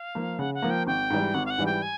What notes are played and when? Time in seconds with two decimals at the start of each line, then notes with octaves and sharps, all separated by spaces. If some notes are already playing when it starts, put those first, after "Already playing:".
Already playing: F5
0.15 F3 A#3
0.39 C#3 F#5
0.55 F#5
0.62 F3 A#3
0.70 G5
0.87 G#1 G5
1.10 G#2 E3 G3
1.34 G#1 F#5
1.46 F5
1.50 F#5
1.58 G#2 E3 G3
1.66 G5
1.82 G#5